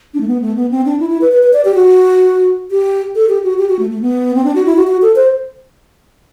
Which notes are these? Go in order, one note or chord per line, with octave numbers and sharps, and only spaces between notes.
D4
A3
B3
A3
B3
C4
D4
E4
E4
B4
B4
B4
D5
G4
F#4
G4
A4
G4
F#4
G4
F#4
A3
A3
B3
C4
D4
F#4
E4
F#4
F#4
A4
C5